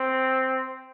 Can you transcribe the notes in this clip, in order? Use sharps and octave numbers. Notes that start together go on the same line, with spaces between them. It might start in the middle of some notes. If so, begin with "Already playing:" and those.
Already playing: C4